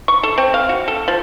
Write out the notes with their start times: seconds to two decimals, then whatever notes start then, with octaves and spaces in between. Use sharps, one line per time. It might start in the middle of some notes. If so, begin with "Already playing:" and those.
0.08 C#6
0.23 A4
0.38 C4
0.54 F5
0.69 F#4
0.88 A4
1.08 F3